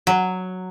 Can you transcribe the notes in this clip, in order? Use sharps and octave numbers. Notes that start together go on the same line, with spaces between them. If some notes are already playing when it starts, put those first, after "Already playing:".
F#3